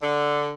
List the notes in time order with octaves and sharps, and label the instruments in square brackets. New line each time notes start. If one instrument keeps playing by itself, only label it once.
[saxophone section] D3